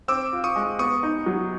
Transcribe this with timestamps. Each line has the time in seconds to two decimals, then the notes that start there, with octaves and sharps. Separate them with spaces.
0.08 C4 D6 E6
0.33 F4
0.44 C#6 D#6
0.56 G#3
0.79 B3 C#6 D#6
1.03 D#4
1.26 F#3